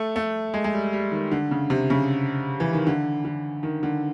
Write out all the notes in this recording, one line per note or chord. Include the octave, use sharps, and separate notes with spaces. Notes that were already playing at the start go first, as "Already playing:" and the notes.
Already playing: A3
A3
G#3
G#3
G3
G3
D#3
D3
C#3
C3
C#3
E3
D#3
D3
D3
D#3
D3